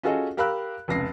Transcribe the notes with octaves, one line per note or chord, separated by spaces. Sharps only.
C#4 F4 F#4 G#4 A4 D#5
G4 A#4 F5 B5 E6 F#6
F1 C#2 A#6 C7